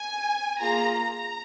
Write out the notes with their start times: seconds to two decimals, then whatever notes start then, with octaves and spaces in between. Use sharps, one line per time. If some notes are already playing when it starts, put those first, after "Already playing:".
Already playing: G#5
0.60 A#3 F4 G#4 A#5
0.97 A#5